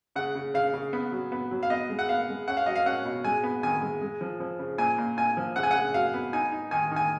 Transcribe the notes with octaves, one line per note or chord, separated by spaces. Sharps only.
C#3 F#5
C#3
C#3 F5
C#3
B3
F#3
B3
F#3
F5
B3 D#5
G#3
F#5
B3 F5
G#3
C#4 F#5
F5
F#3 D#5
F5
C#4 F#5
B2
G#3 G#5
B3
D#3 G#5
G#3
G#3
F3
F3
C#3
A#2 G#5
A#2
A#2 G#5
F3
C#3 F#5
G#5
C#3 F#5
F#3 F5
B3
D#4 G#5
D#4
D#3 G#5
D#3 G#5